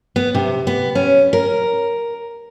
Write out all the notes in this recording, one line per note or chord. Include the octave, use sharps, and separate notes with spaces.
B3
C3
B3
C#4
A#4